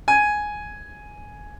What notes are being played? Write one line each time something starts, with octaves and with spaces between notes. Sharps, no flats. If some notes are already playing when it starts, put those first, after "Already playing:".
G#5